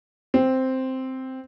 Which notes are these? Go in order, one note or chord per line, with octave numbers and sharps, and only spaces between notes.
C4